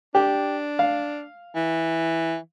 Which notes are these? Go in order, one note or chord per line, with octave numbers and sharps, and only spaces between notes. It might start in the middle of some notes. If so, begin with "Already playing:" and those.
D4 G4
F5
E3